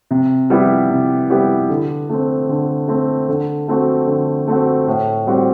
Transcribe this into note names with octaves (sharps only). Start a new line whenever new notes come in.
C3
G3 B3 E4 G4
C3
G3 B3 E4 G4
D3
A3 C4
D3
A3 C4
D3
A3 C4 F#4
D3
A3 C4 F#4
A2
G3 C4 F#4